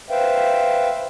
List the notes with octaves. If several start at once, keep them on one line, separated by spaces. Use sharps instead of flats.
B4 C5 E5 F5 G5